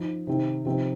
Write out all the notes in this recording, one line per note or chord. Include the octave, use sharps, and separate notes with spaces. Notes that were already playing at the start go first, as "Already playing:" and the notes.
Already playing: F3 D#4
C3 D#3 C4 D#4
C3 F3 C4 D#4